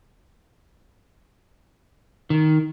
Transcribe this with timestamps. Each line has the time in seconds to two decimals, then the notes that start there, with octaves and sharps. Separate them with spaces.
2.30 D#3